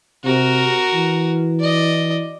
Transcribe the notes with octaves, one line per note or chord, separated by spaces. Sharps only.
C3 F#4 A#4
E3
D5 D#5